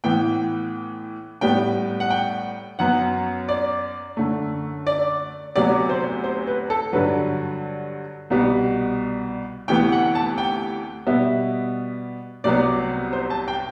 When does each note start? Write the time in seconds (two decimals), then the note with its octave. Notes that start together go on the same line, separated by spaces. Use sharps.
0.04 A2 E3 B3 G5
1.41 A2 G3 B3 G5
2.00 F#5
2.10 G5
2.79 F#2 F#3 B3 F#5
3.49 D5
4.17 F#2 D3 A3
4.87 D5
5.56 D2 C3 F#3 B3 D5
5.89 C5
6.24 C5
6.47 B4
6.70 A4
6.93 G2 D3 F#3 B4
8.30 C2 B2 G3 B3
9.68 D2 C3 E3 B3 G5
9.92 F#5
10.15 A5
10.38 G5
11.07 B2 G3 B3 E5
12.44 C2 C3 F#3 B3 D5
13.13 C5
13.30 A5
13.48 G5